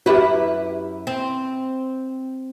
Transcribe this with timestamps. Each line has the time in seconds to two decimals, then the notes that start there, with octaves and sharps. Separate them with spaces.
0.06 F#2 E4 F#4 G4 B4
1.07 C4